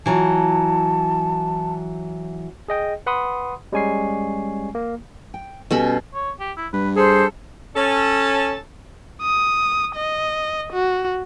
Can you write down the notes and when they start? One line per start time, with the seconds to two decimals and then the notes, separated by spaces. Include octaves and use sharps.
0.06 E3 F#3 F4 A5
2.68 G#4 D#5 G5
3.06 B4 F#5 B5 C6 D#6
3.72 G3 G#3 C#4 G#5 C#6 C7
4.75 A#3
5.34 G5
5.71 B2 G3 B3 C#4 A4 B5
6.14 C#5
6.40 G4
6.57 E4
6.73 G2 B4
6.97 G#4 A4 C5
7.75 C#4 A4 A5
9.22 D#6
9.96 D#5
10.73 F#4